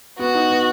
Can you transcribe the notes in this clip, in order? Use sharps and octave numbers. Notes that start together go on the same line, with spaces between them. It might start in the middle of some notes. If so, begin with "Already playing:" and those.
B3 F#4
D#4
B3